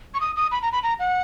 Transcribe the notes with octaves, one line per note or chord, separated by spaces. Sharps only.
C#6
D#6
D#6
B5
A#5
B5
A#5
F#5